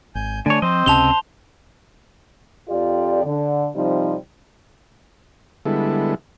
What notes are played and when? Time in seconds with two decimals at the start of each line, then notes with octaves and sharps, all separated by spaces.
0.15 G#1 G#5 G6
0.46 D3 A3 D4 C#5 G#5
0.62 F3 C4 C5 D#5
0.86 C#2 C3 C#4 A5 F7 G7
2.69 F2 F4 G4 D5
3.25 D3
3.75 C3 F3 G3 C4 D#4
5.66 D3 G3 G#3 B3 E4 A4